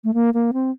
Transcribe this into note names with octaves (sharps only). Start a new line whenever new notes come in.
A3
A#3
A#3
C4